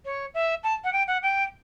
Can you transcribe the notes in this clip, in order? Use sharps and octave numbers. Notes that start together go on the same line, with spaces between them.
C#5
E5
A5
F#5
G5
F#5
G5